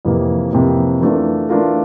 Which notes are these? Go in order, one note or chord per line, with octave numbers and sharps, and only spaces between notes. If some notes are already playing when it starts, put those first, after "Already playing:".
F2 C3 E3 A#3
F2 C3 E3 A#3
E3 A3 D4 F4 A#4
E3 A3 D4 F4 A#4